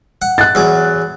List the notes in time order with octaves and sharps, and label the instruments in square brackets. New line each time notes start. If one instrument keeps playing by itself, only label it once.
[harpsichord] F#5
[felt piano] F#6 A6
[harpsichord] E2 F#3 D6